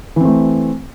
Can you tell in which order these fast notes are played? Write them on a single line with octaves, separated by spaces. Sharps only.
E3 C4 A3